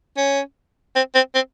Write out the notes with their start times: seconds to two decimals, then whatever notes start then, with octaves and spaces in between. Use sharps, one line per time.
0.17 C#4
0.95 C4
1.15 C4
1.35 C4